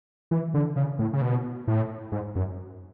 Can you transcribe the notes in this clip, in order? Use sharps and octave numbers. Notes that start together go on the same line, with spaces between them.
E3
D3
C#3
A2
C#3
B2
A2
G#2
F#2